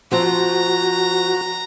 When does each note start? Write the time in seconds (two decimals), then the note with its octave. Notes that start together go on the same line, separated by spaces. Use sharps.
0.12 F3 C4 F#4 A#5